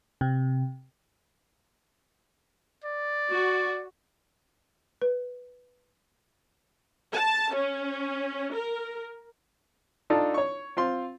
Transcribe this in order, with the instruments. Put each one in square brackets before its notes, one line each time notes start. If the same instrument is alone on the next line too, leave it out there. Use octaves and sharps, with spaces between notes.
[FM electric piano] C3
[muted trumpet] D5
[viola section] F#4
[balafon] B4
[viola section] A5
C#4
A#4
[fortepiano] D4 D#4 F4 A4
C#5 C#6
C4 F4 C6